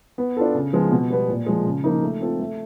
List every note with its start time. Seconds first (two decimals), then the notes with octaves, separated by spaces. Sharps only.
0.18 B3
0.37 D4 F4 A4
0.54 C#3
0.73 F3 G#3 B3
0.92 B2
1.10 G3 B3
1.29 A#2
1.46 F3 G#3
1.66 C#3
1.84 F3 A#3 D#4
2.03 A3
2.20 C4 F4 A4
2.40 A3